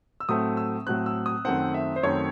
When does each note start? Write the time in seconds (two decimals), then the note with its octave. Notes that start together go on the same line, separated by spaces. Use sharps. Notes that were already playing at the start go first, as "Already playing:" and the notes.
0.20 E6
0.29 A2 F#3 A3 C4 D#6
0.57 E6
0.87 A2 F#3 A3 C4 F#6
1.06 E6
1.26 D#6
1.45 F#2 D#3 A3 C4 F#5
1.74 E5
1.96 C5
2.03 F#2 D#3 A3 C4 C#5